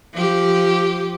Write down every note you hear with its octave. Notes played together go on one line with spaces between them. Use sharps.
F3 G4